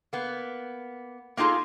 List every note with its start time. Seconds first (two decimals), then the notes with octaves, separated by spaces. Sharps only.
0.13 A#3 B3
1.37 A#3 B3 D#4 F4 G#4 A4